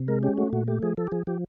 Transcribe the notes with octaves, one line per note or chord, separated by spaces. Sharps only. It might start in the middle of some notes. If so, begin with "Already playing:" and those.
Already playing: C3
G#3 A#4
C#4 G4
A3 F#4
A#2 F#4
A3 G4
F3 G#4
F3 A4
G4
F3 G#4
F3 G4